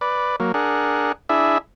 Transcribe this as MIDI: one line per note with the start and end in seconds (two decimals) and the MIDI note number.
0.01 0.36 71
0.01 0.36 74
0.40 0.52 54
0.40 0.52 58
0.54 1.12 62
0.54 1.12 68
0.54 1.12 70
0.54 1.12 78
1.29 1.58 62
1.29 1.58 64
1.29 1.58 68
1.29 1.58 76